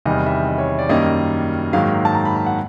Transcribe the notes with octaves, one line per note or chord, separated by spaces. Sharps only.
E2 C3 D#3 G3 D#5
E5
D#5
C#5
D5
F#2 D#3 G3 A#3 D#5
G#2 D#3 F#3 A#3 F5
A5
A#5
B5
B5
F#5